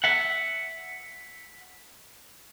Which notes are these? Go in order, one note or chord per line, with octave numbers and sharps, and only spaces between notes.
E5 F#5